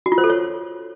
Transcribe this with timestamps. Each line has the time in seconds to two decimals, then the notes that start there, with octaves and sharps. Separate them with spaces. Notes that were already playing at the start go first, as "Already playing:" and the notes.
0.06 F#4
0.12 F4
0.18 C5
0.24 A4
0.30 C#5